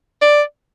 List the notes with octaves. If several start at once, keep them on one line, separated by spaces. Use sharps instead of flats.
D5